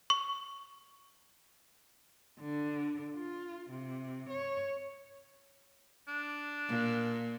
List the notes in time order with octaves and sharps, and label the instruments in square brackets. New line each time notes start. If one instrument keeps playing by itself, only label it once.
[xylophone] C#6
[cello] D3
F4
C3
C#5
[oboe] D4
[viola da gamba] A#2